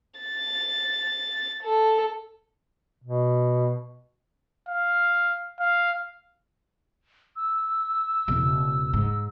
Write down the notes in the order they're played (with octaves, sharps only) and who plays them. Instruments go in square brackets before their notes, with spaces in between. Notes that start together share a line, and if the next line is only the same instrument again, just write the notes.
[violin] A6
A4
[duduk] B2
[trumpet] F5
F5
[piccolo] E6
[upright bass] E1 C#3
G#2